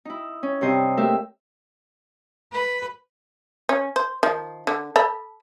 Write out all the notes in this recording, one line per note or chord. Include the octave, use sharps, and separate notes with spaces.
D#4 E4
C#4
G2 C3 C5 D#5
A3 A#3 G4 A#4 E5
B4
C#4
C5
D#3 F3
D3
A4 B5